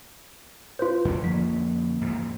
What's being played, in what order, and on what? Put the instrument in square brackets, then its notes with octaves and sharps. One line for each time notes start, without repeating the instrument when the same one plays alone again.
[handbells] F4 B4 C5
[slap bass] F2 D3 C#4
[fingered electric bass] F3 A#3 [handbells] B6
[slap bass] E2 G#2